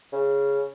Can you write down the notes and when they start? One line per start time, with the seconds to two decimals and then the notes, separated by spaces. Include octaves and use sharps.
0.12 C#3